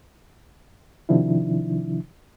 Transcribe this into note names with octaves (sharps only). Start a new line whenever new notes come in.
C3 D#3 F3 D4 E4